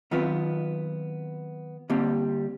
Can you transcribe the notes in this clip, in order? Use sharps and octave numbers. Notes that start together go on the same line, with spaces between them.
D#3 F#3 B3 C4 F4 B4
D3 G3 A#3 C4